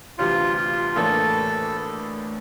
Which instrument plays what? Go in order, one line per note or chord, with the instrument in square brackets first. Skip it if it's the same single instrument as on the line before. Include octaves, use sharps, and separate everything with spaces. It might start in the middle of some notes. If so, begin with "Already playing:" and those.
[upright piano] D2 C3 E3 G3 [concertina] F4
[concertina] F4
[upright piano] A1 A2 E3 A#3 D4 [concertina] A4